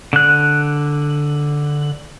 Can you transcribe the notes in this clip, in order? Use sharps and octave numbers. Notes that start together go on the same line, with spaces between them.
D3 F#6